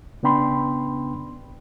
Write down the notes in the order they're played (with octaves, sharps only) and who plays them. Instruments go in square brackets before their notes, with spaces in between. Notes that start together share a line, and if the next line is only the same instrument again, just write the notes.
[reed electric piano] C#3 B3 D4 G5 B5 C6